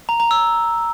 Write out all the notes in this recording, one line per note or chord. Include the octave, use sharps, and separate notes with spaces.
A#5
A#5
E6